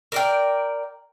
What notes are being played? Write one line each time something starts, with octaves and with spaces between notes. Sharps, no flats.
A#4 D5 G5